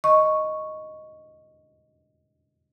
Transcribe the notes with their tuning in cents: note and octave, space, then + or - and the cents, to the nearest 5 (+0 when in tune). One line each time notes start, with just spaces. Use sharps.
D#5 +0 C#6 +0